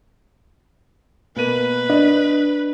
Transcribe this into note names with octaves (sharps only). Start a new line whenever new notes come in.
B2 A#3 B4 D#7
D4 D#5